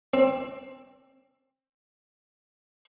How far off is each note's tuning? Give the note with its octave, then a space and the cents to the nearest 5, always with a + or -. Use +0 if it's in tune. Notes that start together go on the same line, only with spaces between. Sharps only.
C4 +20